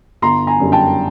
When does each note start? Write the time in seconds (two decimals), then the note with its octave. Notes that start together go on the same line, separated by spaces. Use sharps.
0.22 G1 A#5 C6
0.47 G#5 A#5
0.60 F#2 D3 G3
0.72 G5 A5